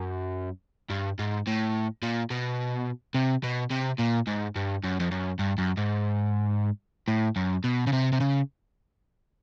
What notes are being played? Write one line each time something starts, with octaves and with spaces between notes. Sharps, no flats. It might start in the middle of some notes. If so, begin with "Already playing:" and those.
Already playing: F#2
G2
G#2
A2
A#2
B2
C3
B2
C3
A#2
G#2
G2
F#2
F2
F#2
G2
F#2
G#2
A2
F#2
B2
C#3
C3
C3
C#3